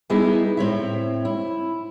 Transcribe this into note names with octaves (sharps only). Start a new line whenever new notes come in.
G3 B3 D#4 E4 G#4
A2 C4 C#5 E5
E4